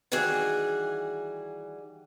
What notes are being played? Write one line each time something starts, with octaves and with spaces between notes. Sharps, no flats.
D#3 E3 G3 F#4 G#4